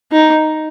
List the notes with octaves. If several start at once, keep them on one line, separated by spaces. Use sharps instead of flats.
D#4